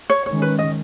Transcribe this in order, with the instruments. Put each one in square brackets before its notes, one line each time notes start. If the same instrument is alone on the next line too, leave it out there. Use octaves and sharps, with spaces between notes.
[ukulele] C#5
[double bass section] D#3 G#3 C#4 [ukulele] C#5
[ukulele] B4
D#5